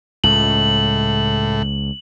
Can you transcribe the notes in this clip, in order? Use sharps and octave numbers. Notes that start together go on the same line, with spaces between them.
C#2 A2 F#7